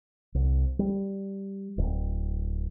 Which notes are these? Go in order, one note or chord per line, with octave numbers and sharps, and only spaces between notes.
C2
G3
D1